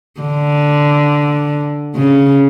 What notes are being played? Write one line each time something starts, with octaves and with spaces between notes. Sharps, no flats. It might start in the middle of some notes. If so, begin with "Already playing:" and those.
D3
C#3